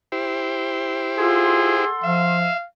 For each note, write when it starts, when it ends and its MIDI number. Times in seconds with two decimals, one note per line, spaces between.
0.12 1.85 64
0.12 1.85 67
0.12 1.85 72
1.18 1.76 65
1.18 1.91 68
1.18 2.37 69
1.18 2.37 78
1.18 2.37 84
2.03 2.47 53
2.03 2.58 76
2.03 2.65 77